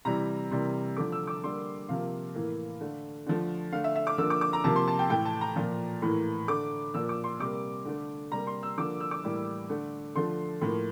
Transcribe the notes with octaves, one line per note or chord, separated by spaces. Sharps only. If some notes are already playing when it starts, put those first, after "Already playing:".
C3 E3 G3 A#5
C3 E3 G3 A#3
D3 F3 A3 D6
E6
D6
D3 G3 A#3 C6
C3 F3 A#3 F5
A2 E3 A#3
D3 A3
D3 F3 A3
D3 A3 F5
E5
E5
D6
D3 F3 A#3 E6
D6
D6
A#5
C3 F3 A#3 A5
C6
A5
G5
A2 E3 A3 G5
A5
A#5
A#2 F3 A#3
A2 E3 A#3
D3 A3 D6
A#2 F3 A#3 E6
D6
C6
C3 G3 A#3 D6
D3 A3
C3 G3 A#3 A#5
C6
E6
D3 F3 A#3 D6
E6
D6
A2 E3 G3 A#3
D3 A3
D3 F3 A3 C6
A2 F3 A#3